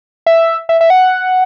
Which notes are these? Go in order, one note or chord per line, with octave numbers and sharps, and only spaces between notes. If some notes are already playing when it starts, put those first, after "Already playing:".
E5
E5
E5
F#5